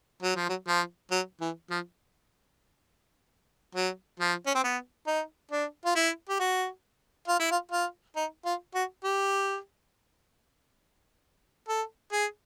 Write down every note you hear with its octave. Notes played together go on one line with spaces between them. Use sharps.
F#3
F3
F#3
F3
F#3
E3
F3
F#3
F3
C#4
C4
B3
D#4
D4
F4
E4
G4
F#4
F4
E4
F4
F4
D#4
F4
F#4
G4
A4
G#4